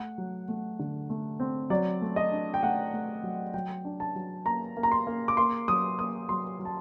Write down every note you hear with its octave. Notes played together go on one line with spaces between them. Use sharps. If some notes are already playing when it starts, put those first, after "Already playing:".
Already playing: A3 F#5
F#3
A3
D3
A3
C4
F#3 D5
A3
D#5
D4
G5
A3 F#5
A3
F#3
F#3 G5
D4
A5
F#3
A#3 A#5
A#3
A#5
C6
A#3
D6
A#3 C6
F#3 D#6
A#3 D#6
F#3 C6
F#3
A5